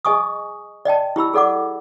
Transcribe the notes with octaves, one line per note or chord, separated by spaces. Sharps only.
G#4 D#5 G#5 C#6 D#6
D5 D#5 G5 A5
E4 G4 B5 E6
G#4 A4 D5 F#5 D6